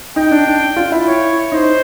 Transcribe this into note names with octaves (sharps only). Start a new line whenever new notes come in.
D#4 G5
D4
D4
F4
E4
C#5
D#4 C5